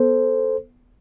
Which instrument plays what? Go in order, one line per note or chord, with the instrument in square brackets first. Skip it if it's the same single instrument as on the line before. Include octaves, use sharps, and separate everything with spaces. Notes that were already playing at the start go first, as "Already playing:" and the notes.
Already playing: [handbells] B3 [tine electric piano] A4 C5